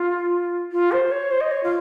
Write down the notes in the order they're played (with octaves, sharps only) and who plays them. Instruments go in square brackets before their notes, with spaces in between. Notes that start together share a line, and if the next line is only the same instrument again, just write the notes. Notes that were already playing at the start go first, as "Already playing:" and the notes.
Already playing: [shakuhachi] F4
F4
C5
C#5
C5
D#5
C#5
F4